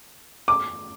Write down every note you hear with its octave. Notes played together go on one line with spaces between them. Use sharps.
D6